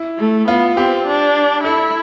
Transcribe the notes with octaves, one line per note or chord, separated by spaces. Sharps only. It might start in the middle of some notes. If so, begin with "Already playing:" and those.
Already playing: E4
A3
B3 F4
C4 G4
D4
E4 A4